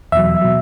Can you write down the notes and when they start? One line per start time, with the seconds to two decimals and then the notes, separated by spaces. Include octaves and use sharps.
0.12 E2 B2 F#3 E5
0.42 B2 F#3